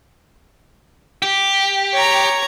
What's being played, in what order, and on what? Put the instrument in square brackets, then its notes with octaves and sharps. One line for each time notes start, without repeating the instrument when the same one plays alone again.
[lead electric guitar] G4
[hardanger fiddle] C#5 A#5